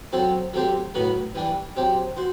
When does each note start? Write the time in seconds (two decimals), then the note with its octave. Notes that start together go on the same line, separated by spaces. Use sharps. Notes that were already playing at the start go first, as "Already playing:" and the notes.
0.12 F#3 C4 F#4 A4
0.53 F#3 A3 C4 G4 C5
0.94 A2 F#3 B3 F#4 B4
1.35 E3 G3 D4
1.76 F#3 C4 G4
2.17 F#4 C5